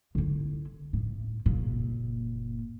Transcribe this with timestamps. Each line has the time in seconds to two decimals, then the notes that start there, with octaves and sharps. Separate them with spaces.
0.15 D3 E4
0.93 A2
1.46 F#1 A#2